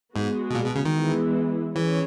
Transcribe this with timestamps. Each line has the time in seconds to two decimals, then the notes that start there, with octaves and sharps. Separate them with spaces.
0.15 G#2 G#3 B3 F#4
0.50 B2
0.55 A#2
0.66 B2
0.76 C#3
0.85 D#3
0.95 E3 G#3 B3 E4
1.76 E3 G#3 C#4 G#4 C#5